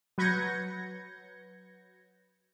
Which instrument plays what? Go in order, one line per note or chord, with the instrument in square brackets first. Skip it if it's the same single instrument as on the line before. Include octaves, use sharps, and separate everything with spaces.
[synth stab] F#3 B4 G6 G#6 A#6 C#7